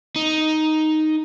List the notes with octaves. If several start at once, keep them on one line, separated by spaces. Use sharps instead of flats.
D#4